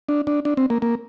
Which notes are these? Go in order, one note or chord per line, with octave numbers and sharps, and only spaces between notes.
D4
D4
D4
C4
A#3
A#3